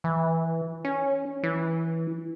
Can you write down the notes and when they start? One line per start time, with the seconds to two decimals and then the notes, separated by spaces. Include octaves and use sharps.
0.04 E3
0.85 C#4
1.43 E3